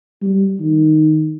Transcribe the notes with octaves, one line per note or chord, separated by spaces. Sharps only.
G3
D#3